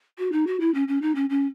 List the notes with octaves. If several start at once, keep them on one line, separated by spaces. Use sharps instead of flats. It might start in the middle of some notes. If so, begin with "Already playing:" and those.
F#4
D#4
F#4
E4
C#4
C#4
D#4
C#4
C#4